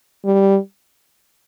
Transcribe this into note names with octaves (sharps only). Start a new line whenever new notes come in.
G3